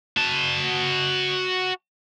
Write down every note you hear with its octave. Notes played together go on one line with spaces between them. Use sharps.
F#4 A5